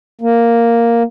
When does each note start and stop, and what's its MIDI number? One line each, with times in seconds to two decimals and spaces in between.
0.21 1.03 58